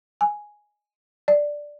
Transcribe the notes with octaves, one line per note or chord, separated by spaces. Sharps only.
G#5
D5